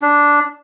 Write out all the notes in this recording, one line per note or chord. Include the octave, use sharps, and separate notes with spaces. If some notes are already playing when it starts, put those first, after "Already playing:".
D4